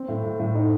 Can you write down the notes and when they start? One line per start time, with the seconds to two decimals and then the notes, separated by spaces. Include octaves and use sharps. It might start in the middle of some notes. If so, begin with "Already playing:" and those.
Already playing: C4
0.08 A2
0.23 A2
0.40 A2
0.55 D#4